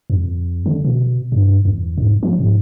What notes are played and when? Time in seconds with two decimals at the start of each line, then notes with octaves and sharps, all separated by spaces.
0.10 F2
0.66 D3
0.84 B2
1.32 G2
1.65 E2
1.98 G#2
2.23 F3
2.39 G#2